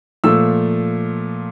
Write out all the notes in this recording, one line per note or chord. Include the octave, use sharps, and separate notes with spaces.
A#2 F3 A3 E6